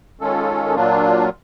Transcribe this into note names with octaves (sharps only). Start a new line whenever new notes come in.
D#3 G#3 C#4 F4 A4
A#2 F#3 A#3 D4 F4